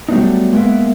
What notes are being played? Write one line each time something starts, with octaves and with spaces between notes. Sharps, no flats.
F#3 G3 A3 B3 D4 D#4
G#3 A#3 B3 A#4 E5